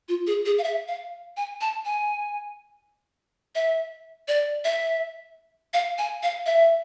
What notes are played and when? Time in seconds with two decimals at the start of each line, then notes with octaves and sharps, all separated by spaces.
0.09 F4
0.27 G#4
0.46 G#4
0.58 F5
0.64 E5
0.88 F5
1.37 G#5
1.61 A5
1.85 G#5
3.55 E5
4.28 D5
4.64 E5
5.74 F5
5.98 G#5
6.23 F5
6.46 E5